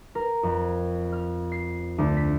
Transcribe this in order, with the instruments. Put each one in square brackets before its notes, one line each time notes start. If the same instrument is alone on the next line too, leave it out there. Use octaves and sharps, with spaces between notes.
[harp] A#4
F2
F6
C7
D2
B6